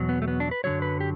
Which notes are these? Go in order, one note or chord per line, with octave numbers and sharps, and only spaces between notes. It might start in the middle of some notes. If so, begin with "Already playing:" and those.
Already playing: E2 B2 F#3
B3
A3
B3
D4
B4
F#2 D3 F#3 C#5
B4
G4